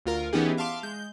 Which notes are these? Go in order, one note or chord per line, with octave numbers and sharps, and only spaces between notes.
D2 F4 A#4
E3 B3 C#4 D#4 G4 G#4
E5 F5 A5 C6 D6
G#3 G6